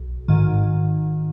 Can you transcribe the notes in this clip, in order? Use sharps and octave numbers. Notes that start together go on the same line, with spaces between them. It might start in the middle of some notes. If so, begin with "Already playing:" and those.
Already playing: B1
G#1 G#2 D#3